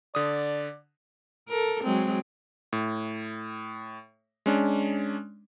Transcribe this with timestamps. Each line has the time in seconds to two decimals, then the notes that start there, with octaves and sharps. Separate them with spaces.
0.15 D3 D5 D#6
1.48 A4 A#4
1.84 F#3 G#3 C4
2.73 A2
4.46 G#3 C#4 D4